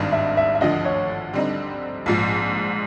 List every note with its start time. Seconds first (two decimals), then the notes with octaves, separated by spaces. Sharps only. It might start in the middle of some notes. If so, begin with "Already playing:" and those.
Already playing: G#1 G2 D#3
0.12 E5
0.37 E5
0.55 E5
0.61 D2 D3 F3 D#5
0.85 C#5
1.34 D3 G3 C4 D#4
2.06 A#1 G#2 F3